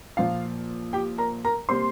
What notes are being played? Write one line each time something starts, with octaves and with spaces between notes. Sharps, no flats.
A#2 F3 A#3 F4 F5
G4 G5
A#4 A#5
A#4 A#5
C3 G3 A#3 C5 C6